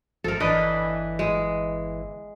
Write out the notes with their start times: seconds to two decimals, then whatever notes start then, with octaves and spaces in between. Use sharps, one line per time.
0.24 A1 F3 A4 A#4
0.40 G1 E3 D4 B4 D#5
1.19 G#3